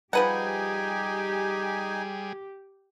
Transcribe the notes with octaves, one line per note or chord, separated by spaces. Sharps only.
F3 G3 D#4 G4 G#4 B4 F#5 G#5